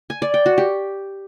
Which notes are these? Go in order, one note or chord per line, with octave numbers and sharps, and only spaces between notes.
G#5
D5
G5
F#4
G4